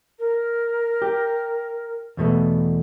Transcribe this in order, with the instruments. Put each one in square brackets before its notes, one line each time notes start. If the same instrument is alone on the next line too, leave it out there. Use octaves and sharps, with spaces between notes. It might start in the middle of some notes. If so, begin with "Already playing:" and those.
[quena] A#4
[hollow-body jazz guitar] G4
E2 B2 A3